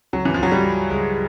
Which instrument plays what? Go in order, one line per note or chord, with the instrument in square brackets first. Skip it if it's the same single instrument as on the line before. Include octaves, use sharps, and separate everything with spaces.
[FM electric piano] C#2 [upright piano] F#3
[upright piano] E3
F3
[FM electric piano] C#2 [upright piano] F#3
[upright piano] G3
[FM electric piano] F#3
[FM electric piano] C#2 [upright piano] G#3